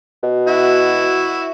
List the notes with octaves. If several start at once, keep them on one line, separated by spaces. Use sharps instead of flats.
B2
E4 F#4